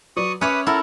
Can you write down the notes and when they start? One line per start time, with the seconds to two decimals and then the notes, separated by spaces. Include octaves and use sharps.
0.17 F#3 B4 D5 C#6 D#6
0.41 C#4 B4 C#5 E5 B5 D6 D#6
0.67 E4 A4 A#4 F#5